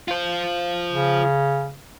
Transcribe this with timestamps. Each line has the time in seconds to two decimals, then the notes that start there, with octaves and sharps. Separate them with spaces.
0.08 F4 C5
0.92 C#3